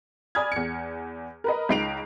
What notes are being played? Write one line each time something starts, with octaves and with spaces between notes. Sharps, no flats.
D5 G#5 B5 D#6 F6 G#6
E2 C#7
A#4 B4 D#5
C#2 D#4 C7 D7 F7